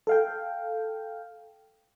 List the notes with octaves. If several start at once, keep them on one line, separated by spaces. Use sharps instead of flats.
A4 F5 G5